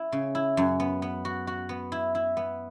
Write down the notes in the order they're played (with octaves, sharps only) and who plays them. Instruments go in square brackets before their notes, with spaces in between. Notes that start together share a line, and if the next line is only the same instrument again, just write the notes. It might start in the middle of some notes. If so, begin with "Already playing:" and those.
Already playing: [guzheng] E4
C#3
E4
F#2
B3
B3
F#4
F#4
B3
E4
E4
B3